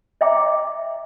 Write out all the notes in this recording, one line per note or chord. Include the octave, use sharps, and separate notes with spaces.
D#5 E5 G5 A#5 D6